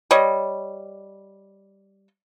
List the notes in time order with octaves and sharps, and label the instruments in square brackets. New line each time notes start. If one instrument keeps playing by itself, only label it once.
[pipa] G3 C#5 D#5